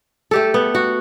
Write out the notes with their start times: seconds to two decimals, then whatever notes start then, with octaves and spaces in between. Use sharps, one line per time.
0.31 A3 G4 A4
0.54 B3
0.75 F#4